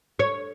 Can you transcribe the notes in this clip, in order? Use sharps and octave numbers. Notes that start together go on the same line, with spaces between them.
C#5